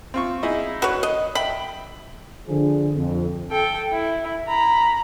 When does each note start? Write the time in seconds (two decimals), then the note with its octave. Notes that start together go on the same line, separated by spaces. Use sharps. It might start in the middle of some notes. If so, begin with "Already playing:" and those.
0.14 C4 F4 C#6
0.43 D#4 E4 G#4
0.82 F#4 B4 C#5
1.03 D#5
1.35 E5 G5 B5
2.48 D3 F3 G#4
2.94 F2
3.51 A4 G5
3.92 E4
4.48 A#5 B5